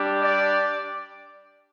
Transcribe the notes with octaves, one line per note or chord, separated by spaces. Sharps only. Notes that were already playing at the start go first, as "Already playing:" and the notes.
Already playing: G3 D4 G4
D5